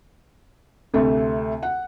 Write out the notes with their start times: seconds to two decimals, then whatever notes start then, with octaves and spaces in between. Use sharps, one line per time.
0.94 D2 C3 A3
1.63 F#5